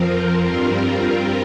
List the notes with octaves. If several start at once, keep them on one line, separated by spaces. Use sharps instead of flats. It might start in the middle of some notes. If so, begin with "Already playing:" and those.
Already playing: F2 F3 C4 F4 A#4
G2 G3 C4 F4 A#4